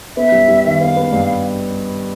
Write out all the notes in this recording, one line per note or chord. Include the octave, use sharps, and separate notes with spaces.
B3 E5
G3
G3
D#3
B3 F5
B3
G2